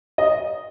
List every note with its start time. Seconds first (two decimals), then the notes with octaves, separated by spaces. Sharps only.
0.18 D#5